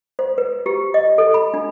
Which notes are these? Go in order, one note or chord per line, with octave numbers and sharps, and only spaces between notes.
C5
B4
G4
D#5
A4
B5
D4